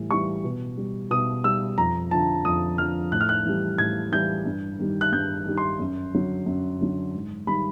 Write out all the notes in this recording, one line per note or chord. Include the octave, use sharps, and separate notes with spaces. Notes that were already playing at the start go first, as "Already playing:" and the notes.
Already playing: A2 E3 G3
E3 G3 C#6
B2
G3
B2 D#6
G3 E6
F2 A#5
D3 F3 A5
F2 D#6
D3 F3 F6
A2 F#6
F6
F#6
E3 G3
A2 G#6
E3 G3 G6
G2
D#3 G3
F#6
G2 G6
D#3 G3
C6
F#2
D3 F#3
F#2
D3 F#3
G#2
D#3 G3 B5